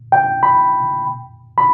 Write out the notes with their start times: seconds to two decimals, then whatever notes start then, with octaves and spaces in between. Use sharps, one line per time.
0.12 G5
0.43 B5
1.58 B5